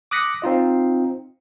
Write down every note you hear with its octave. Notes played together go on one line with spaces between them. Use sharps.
D6 D#6 F#6 A#6 B6 C#7
C4 D#4 F4 D#5